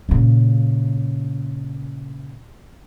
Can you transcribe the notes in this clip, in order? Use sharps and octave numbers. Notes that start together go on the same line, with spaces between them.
A#2 C#3